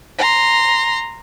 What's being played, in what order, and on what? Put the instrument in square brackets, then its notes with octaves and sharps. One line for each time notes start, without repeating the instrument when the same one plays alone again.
[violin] A#5 C6